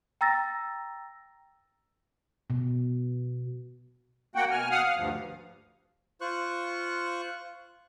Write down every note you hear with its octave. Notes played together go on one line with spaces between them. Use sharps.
G5 A#5 E6 A6 A#6
B2
A#3 F#4 F#5 G5
B2 G#5 F6
F5 F#5 D#6 F6
F5
D2 G2 F3
F4 C5 C#6 F#6